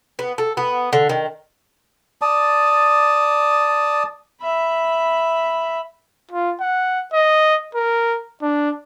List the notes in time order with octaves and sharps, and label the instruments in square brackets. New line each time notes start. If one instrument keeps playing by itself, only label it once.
[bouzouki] B3
A4
B3
D3
D#3
[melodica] D5 A5 D#6
[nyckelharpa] E5 B5
[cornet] F4
F#5
D#5
A#4
D4